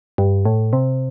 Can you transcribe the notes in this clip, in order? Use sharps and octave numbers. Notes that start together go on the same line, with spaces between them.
G2
A2
C3